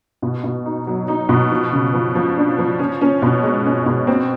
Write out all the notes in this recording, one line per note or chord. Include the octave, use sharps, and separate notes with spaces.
B2
B2
D#4
F#3
D#4
B2
F3
C#3
F3
F3
D4
F3
C#4
C#4
B2
G#3
C#4
B2
C4